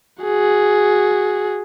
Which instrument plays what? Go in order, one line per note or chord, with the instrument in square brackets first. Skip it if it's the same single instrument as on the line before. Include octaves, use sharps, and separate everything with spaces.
[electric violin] F#4 G#4